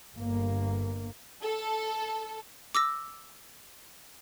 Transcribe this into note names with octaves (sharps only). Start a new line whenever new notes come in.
G1 G2 A#3
A4
D6 E6 A#6